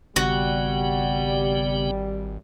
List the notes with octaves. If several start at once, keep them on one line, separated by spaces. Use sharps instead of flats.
G#1 C#3 G3 B3 F#4 G4